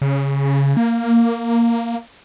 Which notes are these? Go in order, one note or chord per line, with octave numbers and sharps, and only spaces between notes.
C#3
A#3